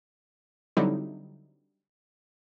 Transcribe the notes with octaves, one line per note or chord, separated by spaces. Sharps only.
D3 F#3 G3 C4 D#4 E4